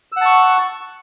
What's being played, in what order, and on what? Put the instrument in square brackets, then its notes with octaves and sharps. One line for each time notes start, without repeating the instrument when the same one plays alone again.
[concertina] E6
F#5
A5
C#6